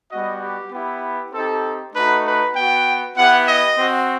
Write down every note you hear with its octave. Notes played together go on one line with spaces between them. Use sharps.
G3 B3 F#4 D#5
G4
B3 E4 G4
C4 D#4 G4 A4
A3 D#4 F#4 B4
B4
B3 F#4 G5
B3 E4 G4 F#5
D#5
C4 F#4